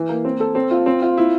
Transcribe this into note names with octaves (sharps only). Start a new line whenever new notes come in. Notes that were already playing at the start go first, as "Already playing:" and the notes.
Already playing: E3
A#3
C4
A4
C4
F4
C4
F4
E4